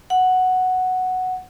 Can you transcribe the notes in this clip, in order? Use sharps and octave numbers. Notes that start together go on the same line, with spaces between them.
F#5